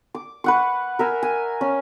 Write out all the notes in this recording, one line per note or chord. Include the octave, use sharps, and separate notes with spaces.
D6
B4 F#5 C#6
A#4 E5 G#5
G#5
C#4